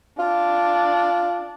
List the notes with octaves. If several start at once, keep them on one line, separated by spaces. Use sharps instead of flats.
D4 F4